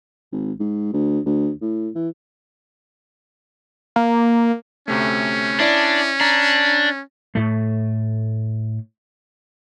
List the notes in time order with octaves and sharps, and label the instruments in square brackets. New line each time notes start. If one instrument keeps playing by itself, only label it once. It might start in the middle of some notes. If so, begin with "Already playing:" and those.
[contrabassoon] G#1
G#2
D2
D2
A2
E3
[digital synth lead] A#3
[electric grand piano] D2 C3 A3 [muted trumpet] C#4
[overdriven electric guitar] D4 [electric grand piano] E4 D5
[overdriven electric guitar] D4 [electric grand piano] A#5
[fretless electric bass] A2 A3